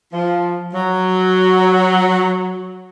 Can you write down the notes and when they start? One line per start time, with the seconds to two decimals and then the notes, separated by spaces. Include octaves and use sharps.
0.13 F3
0.74 F#3